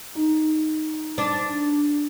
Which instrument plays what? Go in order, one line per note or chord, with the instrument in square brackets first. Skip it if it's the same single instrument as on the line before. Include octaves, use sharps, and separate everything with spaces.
[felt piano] D#4
[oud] D4